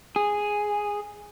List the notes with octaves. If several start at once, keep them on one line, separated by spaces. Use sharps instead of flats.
G#4